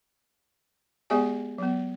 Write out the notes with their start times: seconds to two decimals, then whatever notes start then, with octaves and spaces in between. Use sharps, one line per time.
1.10 G#3 B3 G4 G#4 D5 G#5
1.58 F#3 B3